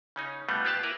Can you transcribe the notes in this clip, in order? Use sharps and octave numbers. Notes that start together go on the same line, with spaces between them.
C#3 C#4 D#4
B2 G3 A3 B3 D#4 F4
B3 F4 G4 D5 A5
A#3 E4 A#4 B4